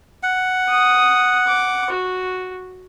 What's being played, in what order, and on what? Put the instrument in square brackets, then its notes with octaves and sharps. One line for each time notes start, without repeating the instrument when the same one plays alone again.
[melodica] F#5
[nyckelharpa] D#6
D6
F#4